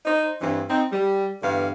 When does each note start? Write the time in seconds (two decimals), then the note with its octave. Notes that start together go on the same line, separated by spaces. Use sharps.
0.06 D#4 C5
0.41 G2 E3 C4 D4
0.69 C4 D#4
0.92 G3
1.42 G2 D3 E3 B3 F5